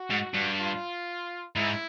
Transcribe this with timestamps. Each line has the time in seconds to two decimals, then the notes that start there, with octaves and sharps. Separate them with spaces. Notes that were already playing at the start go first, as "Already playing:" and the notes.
Already playing: F#4
0.11 G#2
0.34 G2
0.58 F4
1.55 G#2 E4